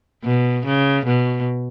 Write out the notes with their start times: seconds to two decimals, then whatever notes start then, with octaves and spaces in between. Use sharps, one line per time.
0.24 B2
0.66 C#3
1.06 B2